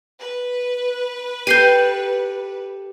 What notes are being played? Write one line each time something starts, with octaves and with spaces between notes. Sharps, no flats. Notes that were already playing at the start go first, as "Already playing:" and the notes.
B4
G4 A4 G6 C7 D#7